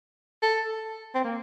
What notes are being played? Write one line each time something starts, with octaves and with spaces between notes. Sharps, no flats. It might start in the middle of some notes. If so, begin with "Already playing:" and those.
A4
C4
A#3